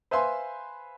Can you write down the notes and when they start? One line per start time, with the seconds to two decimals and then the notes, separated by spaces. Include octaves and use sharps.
0.11 B4 C5 E5 F5 G#5 C6